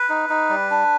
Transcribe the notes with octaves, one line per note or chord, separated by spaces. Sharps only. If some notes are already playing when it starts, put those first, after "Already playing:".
Already playing: B4
D#4
D#4
G3
D4